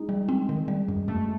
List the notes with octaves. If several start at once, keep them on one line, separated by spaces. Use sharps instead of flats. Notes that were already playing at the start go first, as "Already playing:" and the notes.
Already playing: G#3 D#4
G3
C4
D#3
G3
F#2
F#2 A3